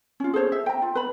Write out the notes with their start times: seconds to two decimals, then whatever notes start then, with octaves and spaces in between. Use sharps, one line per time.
0.20 C#4 F4
0.34 G#4 A4 C5 C#5
0.52 E5
0.66 G5 A#5
0.82 F4
0.95 B4 B5